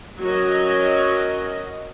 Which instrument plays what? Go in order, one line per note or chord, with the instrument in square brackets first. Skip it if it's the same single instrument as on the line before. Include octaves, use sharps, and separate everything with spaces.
[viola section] F#3 C#4 F#4 A#4 D#5